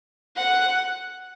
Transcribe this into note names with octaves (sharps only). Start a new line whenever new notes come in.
F#5